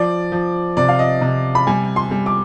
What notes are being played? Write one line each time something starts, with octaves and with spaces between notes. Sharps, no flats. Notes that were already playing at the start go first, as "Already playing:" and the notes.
Already playing: F3 D5
F3
C3 D5
F5
D#5
C3
B5
G3 G#5
C6
G3
D6